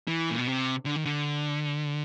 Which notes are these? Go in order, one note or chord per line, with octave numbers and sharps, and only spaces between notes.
E3
A#2
B2
C3
D3
D#3
D3